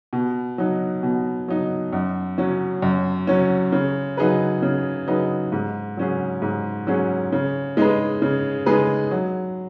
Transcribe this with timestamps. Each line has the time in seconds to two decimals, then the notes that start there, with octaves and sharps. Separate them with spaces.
0.13 B2
0.58 F#3 D#4
1.03 B2
1.48 F#3 D#4
1.93 F#2
2.38 F#3 C#4
2.82 F#2
3.27 F#3 C#4
3.72 C#3
4.17 F#3 D#4 G#4 B4
4.62 C#3
5.07 F#3 D#4 G#4 B4
5.52 G#2
5.97 F#3 C#4 G#4
6.42 G#2
6.87 F#3 C#4 G#4
7.32 C#3
7.77 G#3 D#4 G#4 B4
8.22 C#3
8.66 G#3 D#4 G#4 B4
9.11 F#3